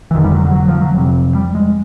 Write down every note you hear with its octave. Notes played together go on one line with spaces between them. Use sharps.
E3
F1 F2 D3 D#3
G3
F#3
F#3
F#3
F3
F#3
F1 F2 C3
G3
G#3